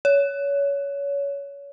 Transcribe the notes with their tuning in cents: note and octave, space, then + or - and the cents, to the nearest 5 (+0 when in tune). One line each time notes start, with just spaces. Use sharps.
C#5 +25